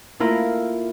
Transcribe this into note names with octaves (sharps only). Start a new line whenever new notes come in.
A3 A#3 E4 F4 A#4